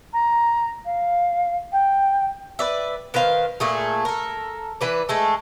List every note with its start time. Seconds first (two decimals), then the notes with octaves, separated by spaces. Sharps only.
0.13 A#5
0.85 F5
1.72 G5
2.59 B4 D5 E5
3.14 D#3 B4 C5 F5
3.60 A#2 A3 G#4
4.05 A4 A#4
4.81 E3 B4 D5
5.09 G#3 A3 A4